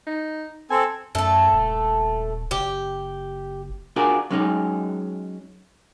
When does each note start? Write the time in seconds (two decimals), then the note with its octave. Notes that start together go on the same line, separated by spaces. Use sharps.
0.07 D#4
0.71 C4 A4 G#5
1.15 F#2 A3 A4
1.53 D#1
2.51 F#1 G4
3.96 D4 F4 F#4 G#4 A#4
4.30 F#3 G#3 C#4 D#4 G#4